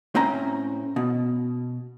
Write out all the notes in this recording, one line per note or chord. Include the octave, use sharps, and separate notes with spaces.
A2 C4 C#4 A#5
B2